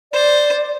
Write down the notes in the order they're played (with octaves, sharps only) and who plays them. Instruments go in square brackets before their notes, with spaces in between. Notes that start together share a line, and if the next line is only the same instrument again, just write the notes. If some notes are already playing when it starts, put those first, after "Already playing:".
[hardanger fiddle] C5 [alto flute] D5